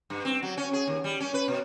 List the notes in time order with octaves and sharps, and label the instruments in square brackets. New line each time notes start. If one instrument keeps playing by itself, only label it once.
[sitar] G2
C4
F#3
C#4
G#4
D#2
G3
C#4
B4
B2